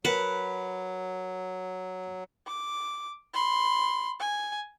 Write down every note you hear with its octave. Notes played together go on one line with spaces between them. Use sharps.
F#3 A#4 B4 F#5 A5
D6
B5 C6
G#5